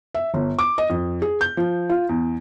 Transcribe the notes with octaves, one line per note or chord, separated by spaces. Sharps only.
E5
G1
D6
D#5
F2
G#4
G6
F3
F4
E2